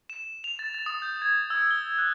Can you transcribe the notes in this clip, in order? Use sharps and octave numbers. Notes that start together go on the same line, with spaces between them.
E7
F7
A6
A6
D#6
G6
G#6
E6
G7
F#6